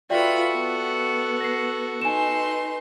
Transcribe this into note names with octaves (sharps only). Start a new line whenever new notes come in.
F4 F#4 A4 B4 D5 E5 G5 B5
B3
A#6 C7
D#4 B4 G#5 C6 E7